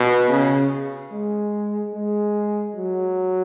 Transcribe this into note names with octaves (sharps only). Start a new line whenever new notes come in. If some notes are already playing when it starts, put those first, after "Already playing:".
Already playing: B2
C#3
G#3
G#3
F#3